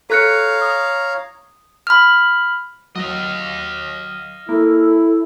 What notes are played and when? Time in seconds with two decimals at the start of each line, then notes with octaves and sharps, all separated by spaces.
0.10 A4 C#5 F5 A#5 F#6 C#7
0.62 D#6
1.87 B5 F6
2.96 F#3 D#5 F5
4.49 A#3 E4 A4